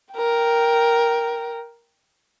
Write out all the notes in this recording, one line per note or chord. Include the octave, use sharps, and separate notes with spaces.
A#4 G5